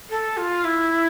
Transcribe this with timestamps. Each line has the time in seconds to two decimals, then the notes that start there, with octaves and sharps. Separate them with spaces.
0.10 A4
0.37 F4
0.64 E4